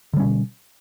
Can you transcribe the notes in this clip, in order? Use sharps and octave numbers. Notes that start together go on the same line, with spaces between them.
B2 D3 G3 C#4